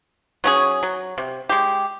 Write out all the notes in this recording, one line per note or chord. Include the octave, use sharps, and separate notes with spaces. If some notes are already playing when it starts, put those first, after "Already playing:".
F#3 C#4 G#4
F#3
C3
G#3 G4